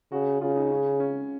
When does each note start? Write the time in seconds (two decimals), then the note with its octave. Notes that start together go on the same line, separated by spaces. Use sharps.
0.12 C#3 F#4
0.41 C#3 F4
0.57 D#4
0.71 C#4
1.00 C#4